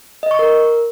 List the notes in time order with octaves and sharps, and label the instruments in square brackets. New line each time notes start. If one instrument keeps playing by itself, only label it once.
[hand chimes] D#5
C#6
A#4